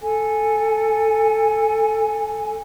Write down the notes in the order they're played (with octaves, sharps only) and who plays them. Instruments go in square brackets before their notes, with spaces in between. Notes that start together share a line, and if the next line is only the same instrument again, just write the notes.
[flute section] A4 G#5